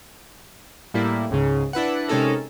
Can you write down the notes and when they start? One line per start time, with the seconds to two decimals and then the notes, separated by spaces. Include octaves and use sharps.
0.94 A2 G3 A#3 E4
1.31 C#2 G#2 C#3
1.73 D4 E4 B4 F#5
2.08 C3 G#3 C#4 D#4 A4 A#4